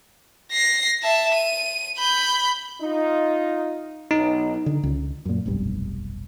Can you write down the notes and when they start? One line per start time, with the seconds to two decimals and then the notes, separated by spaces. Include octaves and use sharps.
0.52 A#6 C7
1.03 E5 A5
1.35 D#7
1.98 B5 G6
2.82 D#4 F4
4.11 B1 D#4
4.66 D3
4.83 C#2
5.25 F#2 A#2
5.46 F1 B1 G2